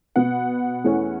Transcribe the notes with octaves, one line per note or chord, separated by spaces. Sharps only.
B2 B3 F#5
E2 E3 A3 C#4